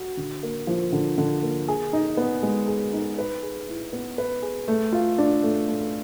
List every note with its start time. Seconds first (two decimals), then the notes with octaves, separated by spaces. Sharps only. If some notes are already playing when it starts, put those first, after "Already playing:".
Already playing: F#4
0.17 D3
0.43 A#3
0.67 F3
0.93 D3
1.18 D3
1.43 A#3
1.68 G#4
1.93 D#4
2.17 B3
2.43 G#3
2.68 G#4
2.93 D#4
3.18 B4
3.43 G#4
3.68 E4
3.93 B3
4.18 B4
4.42 G#4
4.68 A3
4.93 F4
5.18 D4
5.43 A3
5.67 A3